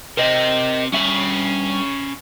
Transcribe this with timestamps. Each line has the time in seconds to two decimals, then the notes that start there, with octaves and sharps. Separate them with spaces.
0.17 C3 C4 A#4 D#5
0.92 G2 C#4 E5 B5